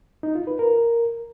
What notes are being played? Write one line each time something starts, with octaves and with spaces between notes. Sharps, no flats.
D#4
F4
B4
A#4